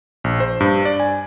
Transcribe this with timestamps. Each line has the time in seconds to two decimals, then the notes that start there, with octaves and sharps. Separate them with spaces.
0.24 A#1
0.40 C5
0.60 G2
0.85 D5
1.00 G#5